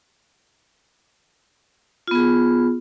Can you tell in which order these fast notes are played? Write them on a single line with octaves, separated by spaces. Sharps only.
F4 B3 G#4